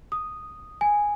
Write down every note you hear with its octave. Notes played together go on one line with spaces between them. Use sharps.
D#6
G#5